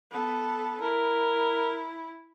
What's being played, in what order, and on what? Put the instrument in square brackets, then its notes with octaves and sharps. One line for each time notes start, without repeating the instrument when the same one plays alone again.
[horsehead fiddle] B3 A4
[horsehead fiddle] E4 [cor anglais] A#4